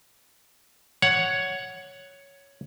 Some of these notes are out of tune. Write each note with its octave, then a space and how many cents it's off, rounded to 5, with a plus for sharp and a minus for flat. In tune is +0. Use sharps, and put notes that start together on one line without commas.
C#5 +5 F#5 +0